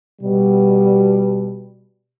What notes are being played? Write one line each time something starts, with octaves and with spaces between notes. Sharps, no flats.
B2 G3